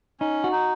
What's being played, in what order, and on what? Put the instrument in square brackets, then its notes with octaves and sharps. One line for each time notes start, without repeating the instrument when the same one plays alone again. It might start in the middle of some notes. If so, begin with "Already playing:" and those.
[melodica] C#4 [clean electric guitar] D#4
[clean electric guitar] F#4
[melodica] D#4